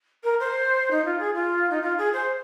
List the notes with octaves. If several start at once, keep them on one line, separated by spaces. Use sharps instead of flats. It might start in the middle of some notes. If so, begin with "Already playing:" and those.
A#4
C5
D#4
F4
G#4
F4
D#4
F4
G#4
C5